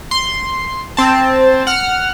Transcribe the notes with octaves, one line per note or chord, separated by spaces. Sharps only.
C6
C4 A5
F#5 F6